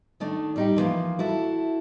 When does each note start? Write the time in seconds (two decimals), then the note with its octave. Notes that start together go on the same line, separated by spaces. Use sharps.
0.20 D#3 A3 D4
0.56 G3 D#4 G4
0.76 D3 E3 F3 A#3
1.19 E4 F#4 A4